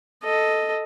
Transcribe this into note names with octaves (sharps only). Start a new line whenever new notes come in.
A4 D#5